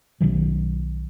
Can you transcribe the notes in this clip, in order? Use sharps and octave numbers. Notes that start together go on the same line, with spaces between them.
B1 B2 D#3 F#3